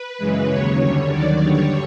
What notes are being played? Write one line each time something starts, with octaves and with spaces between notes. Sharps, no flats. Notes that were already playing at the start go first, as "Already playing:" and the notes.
Already playing: B4
F#2 C#3 E3 G#3
D#2 C#3 F#3 C#5
F#2 D3 G3
D#2 D#3 F#3 D5
G2 D3 G3 C#5